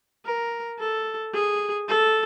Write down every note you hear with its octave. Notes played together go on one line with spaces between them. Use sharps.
A#4
A4
G#4
A4